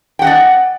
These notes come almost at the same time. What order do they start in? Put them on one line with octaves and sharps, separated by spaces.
G5 F#5 D#5 D5